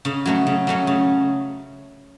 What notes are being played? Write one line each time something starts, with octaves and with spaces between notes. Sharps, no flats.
C#3
F#3 A3 C#4
C#3
F#3 A3 C#4
C#3